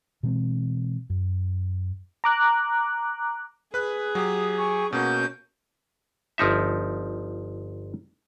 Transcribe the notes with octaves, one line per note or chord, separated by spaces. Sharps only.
B2 E3 G#3 C4
F#2
A#5 D6 F#6
G#4 B4 F#6
F#3 G4 D#6
G5 G#5 C#6
B2 A#3 C#4 F#4 G6
G1 F3 D#4 E5